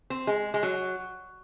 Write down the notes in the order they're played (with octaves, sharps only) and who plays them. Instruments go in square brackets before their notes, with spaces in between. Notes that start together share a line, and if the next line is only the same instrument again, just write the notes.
[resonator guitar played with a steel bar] C4
G#3
G#3
F#3